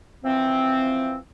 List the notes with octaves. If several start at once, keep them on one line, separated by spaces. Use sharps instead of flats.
E3 F3 C4